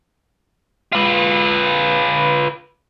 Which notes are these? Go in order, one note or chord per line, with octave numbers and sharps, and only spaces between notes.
F4 B4